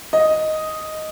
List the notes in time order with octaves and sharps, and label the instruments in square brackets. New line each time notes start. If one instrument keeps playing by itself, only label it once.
[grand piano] D#5